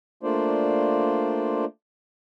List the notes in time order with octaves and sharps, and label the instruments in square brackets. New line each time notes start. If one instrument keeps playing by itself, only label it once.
[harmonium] A3 A#3 D4 F4 C5 D5